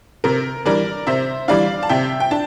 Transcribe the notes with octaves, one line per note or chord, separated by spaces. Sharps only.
C3 A#4
E3 G3 D4 A#4 D5
C3 C5 E5
E3 G3 D4 D5 F5
A5
C3 E5 G5
G5
D4 A5